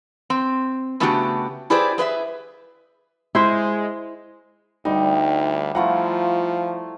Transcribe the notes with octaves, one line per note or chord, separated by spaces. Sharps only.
C4
C#3 A3 B3 D4 F#4 G4
E4 G4 G#4 B4 C5 D5
G#4 B4 D5 E5
G#3 E4 C5 E5
D2 G3 D#4
F3 A3 E4 F4 F#5 A#5